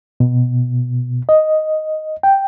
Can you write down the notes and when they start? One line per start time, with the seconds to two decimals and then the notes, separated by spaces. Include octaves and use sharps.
0.20 B2
1.29 D#5
2.23 G5